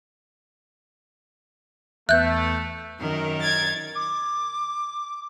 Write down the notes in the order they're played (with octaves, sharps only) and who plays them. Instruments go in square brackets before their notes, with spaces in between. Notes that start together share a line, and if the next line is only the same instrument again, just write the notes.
[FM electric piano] E2 B3 [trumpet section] A3 [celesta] E5 [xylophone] F#6 G6
[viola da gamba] F#2 D#3 A#4
[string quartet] G#6 A6
[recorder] D6